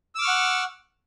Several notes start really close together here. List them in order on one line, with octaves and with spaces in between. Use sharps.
E6 D6 F6 C#6 F#5